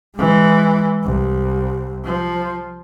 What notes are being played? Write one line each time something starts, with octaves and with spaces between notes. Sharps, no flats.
E3 G#3
C2
F3